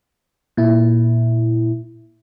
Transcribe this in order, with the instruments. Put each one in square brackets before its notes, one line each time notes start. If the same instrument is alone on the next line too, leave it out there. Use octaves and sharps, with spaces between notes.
[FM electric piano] A#2 E4